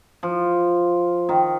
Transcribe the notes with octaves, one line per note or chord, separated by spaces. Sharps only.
F3
D#3